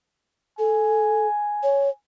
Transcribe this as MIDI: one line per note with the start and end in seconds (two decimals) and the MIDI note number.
0.59 1.27 69
0.59 1.95 80
1.63 1.89 73